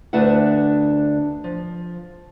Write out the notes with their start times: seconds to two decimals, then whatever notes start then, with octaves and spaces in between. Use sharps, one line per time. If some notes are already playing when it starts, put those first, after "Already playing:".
0.13 D2 D4 B4 E5 F#5
1.44 F3